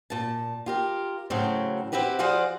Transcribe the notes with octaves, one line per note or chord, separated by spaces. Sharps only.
A#2 A5
F4 G4 A#4
A2 C#3 F#3 C4
C4 E4 F#4 G4 B4
F3 F#4 G#4 C5 D5 F5